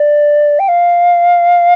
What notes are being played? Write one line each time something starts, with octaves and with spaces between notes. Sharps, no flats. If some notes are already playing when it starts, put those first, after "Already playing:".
Already playing: D5
G5
F5